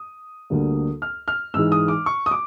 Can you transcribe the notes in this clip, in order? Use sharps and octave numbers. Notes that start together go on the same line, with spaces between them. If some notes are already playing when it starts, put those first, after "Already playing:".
Already playing: D#6
D2 D3 G3 A#3
F6
F6
G#2 E3 G#3 E6
D#6
D6
C#6
D#6
D6